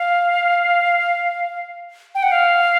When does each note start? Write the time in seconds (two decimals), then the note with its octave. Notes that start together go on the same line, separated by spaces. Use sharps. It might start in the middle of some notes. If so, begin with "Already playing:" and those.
Already playing: F5
2.15 G5
2.23 F#5
2.32 F5